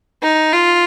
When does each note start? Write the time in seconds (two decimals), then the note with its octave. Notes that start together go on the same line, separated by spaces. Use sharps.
0.23 D#4
0.53 F4